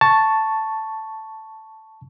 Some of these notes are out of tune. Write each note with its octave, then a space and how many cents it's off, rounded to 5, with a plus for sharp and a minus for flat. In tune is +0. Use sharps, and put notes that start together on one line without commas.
A5 +0 C#6 +0